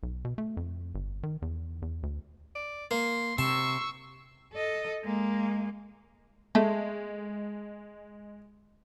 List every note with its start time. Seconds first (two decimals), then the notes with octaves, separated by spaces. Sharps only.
0.03 B1
0.25 B2
0.38 A3
0.57 F2
0.95 G1
1.23 D#3
1.42 E2
1.82 E2
2.03 D2
2.55 D5
2.91 A#3 C6
3.38 C3 A5 C6 C#6 E6
4.53 A4 D#5
5.04 G#3 A#3
6.55 G#3 A3